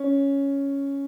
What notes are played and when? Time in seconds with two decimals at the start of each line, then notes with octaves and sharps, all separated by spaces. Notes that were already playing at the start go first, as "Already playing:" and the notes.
Already playing: C#4